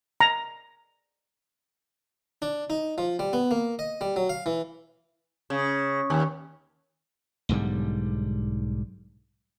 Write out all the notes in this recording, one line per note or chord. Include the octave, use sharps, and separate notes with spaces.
A#5
D4
D#4
F3
G3
B3
A#3
D#5
G3
F#3
F5
E3
C#3
D#2
B1 G#2 D3 G3